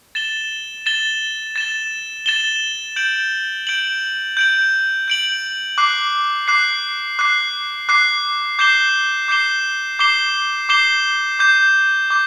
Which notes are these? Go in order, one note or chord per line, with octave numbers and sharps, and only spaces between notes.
A6 E7 G7
A6 E7 G7
A6 E7 G7
A6 E7 G7
G6 D7 F#7
G6 D7 F#7
G6 D7 F#7
G6 D7 F#7
D6 F#6 C7
D6 F#6 C7
D6 F#6 C7
D6 F#6 C7
D6 G6 C7 E7 G7
D6 G6 C7 E7 G7
D6 G6 C7 E7 G7
D6 G6 C7 E7 G7
D6 G6 C7 E7
D6 G6